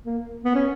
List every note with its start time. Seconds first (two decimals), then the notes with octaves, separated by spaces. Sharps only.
0.05 A#3
0.44 B3
0.55 C#4